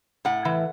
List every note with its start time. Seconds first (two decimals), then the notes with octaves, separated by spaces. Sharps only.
0.25 A2 F#5
0.45 E3